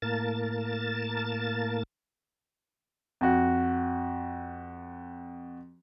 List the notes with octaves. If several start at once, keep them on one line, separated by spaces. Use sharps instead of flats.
A2 A#3 A#4 A5 A6
F2 F#4